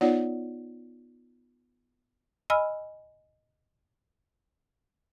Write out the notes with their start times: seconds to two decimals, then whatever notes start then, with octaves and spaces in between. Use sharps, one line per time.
0.01 B3 D#4 F4 C#5 D5 F#5
2.50 D#5 G#5 B5 E6 F6